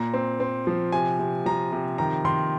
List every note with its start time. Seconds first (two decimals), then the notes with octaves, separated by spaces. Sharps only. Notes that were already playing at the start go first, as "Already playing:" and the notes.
Already playing: A#2 A#5
0.14 C4
0.40 C4
0.67 F3
0.92 C3 G#5
1.19 C3
1.46 F3 A#5
1.72 C3
1.98 D#3 A#5
2.25 D#3 C6